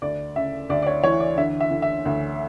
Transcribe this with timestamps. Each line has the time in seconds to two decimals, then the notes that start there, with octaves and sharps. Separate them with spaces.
0.02 D2 D5
0.36 C#3 E5
0.69 D2 D5
0.82 D5
0.87 C#5
1.04 E3 C#5
1.20 D5
1.37 D3 E5
1.60 E5
1.71 D3
1.82 E5
2.05 D2